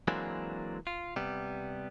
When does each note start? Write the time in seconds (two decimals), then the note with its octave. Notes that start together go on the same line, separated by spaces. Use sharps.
0.08 E3 F#3 G#3 A#3 C4 D4
0.87 F4
1.16 C3 G3 B3